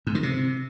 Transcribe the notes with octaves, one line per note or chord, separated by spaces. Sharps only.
G#2
D#3
C3